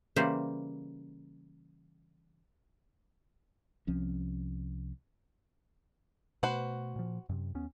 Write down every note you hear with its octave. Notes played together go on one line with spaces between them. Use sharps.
C#3 E3 G3 A#3 C5
C2 F3 C4 C#4
B2 A3 F#4 B4 C5
A#2 F3
F#2 C3
D#2 B3 C#4